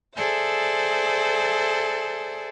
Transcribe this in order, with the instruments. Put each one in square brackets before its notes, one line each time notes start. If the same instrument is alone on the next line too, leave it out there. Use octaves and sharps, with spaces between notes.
[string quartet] G#4 A4 C5 D5 E5